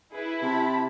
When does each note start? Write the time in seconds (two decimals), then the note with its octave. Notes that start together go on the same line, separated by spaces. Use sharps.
0.12 E4 G#4 B4
0.42 C3 A5 B5